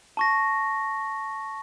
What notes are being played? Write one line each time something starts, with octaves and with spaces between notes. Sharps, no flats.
A5 C#6 A#6